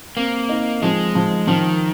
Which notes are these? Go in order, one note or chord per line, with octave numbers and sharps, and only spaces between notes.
A#3 C4
D#4
F3 G#3
F3
D#3 F3